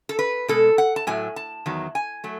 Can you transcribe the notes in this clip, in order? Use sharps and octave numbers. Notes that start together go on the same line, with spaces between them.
A4
B4
B2 G#3 A4
F#5
A5
A2 F#3 A3 G#5
A5
E2 D#3 F#3
G#5
F#3 A3